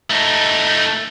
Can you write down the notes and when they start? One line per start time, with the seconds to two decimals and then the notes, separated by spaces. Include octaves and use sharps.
0.10 A3 D#4